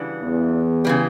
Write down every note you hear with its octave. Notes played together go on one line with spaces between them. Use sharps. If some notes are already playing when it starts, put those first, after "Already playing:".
Already playing: C#3 E3 G3 D4 F#4
E2
C#3 E3 G3